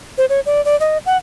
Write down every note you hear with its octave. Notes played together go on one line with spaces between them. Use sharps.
C5
C#5
D5
D5
D#5
F#5